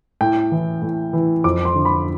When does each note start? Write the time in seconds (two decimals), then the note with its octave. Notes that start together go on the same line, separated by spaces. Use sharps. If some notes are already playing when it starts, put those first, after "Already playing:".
0.21 A2 G5
0.52 E3
0.82 A2
1.13 E3
1.44 F2 D6
1.65 C6
1.76 D3
1.85 B5